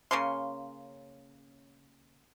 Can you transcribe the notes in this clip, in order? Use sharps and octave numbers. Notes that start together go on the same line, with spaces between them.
C#3 A#3 C#4 C6